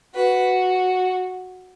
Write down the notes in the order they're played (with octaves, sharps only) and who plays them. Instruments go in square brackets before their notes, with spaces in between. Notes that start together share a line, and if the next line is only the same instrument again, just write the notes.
[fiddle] F#4 [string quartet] B4